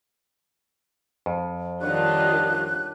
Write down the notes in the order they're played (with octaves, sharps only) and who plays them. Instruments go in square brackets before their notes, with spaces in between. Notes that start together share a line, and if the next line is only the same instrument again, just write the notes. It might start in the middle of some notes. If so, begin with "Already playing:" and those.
[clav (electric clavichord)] F2
[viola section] D#3 G3 F4 [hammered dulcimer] D4 C#5 F#5 [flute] F#6